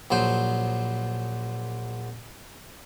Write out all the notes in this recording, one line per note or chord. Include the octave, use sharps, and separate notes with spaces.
A#1 F#3 C5